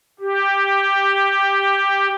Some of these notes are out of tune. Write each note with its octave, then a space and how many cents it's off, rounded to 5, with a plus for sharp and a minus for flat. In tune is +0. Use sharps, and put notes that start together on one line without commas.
G4 +5